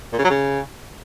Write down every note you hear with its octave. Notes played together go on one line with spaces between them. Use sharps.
A#2
C#3
F#3
C#3